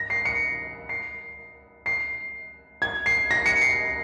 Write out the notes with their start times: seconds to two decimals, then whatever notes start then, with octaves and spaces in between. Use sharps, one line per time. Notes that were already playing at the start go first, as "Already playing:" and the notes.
Already playing: A#6
0.10 C7
0.25 C#7
0.89 C7
1.86 C7
2.82 G#6
3.06 C7
3.31 A#6
3.46 C#7
3.62 C7